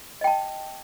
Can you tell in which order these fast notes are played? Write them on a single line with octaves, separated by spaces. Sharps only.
D#5 G5 A5